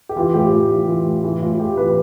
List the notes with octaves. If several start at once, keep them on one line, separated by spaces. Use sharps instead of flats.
G4
E3 F4
A2 G4
A2 F4
E3 G4
E3 F4
A2
E3 G4
A2 F4
F4
A2 G4
E3 B4